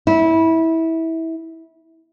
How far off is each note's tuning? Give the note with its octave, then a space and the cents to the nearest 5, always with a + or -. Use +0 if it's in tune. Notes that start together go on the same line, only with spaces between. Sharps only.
E4 -20